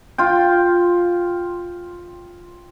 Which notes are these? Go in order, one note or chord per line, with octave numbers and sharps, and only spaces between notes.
F4 G5